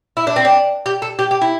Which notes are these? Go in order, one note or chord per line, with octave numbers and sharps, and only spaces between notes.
E4
D4
C4
D4
G4
A4
G4
G4
E4